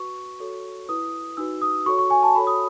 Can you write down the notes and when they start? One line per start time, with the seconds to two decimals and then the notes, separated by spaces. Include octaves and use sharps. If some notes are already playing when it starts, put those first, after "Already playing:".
Already playing: F#4 B4 C#6
0.40 F#4 A4 C#5
0.89 E4 B4 D#6
1.37 D#4 F#4 B4 E6
1.62 D#6
1.86 F#4 A4 C#5 C#6
1.98 C#6
2.10 G#5
2.23 A5
2.35 F#4 A4 C#5 B5
2.47 D#6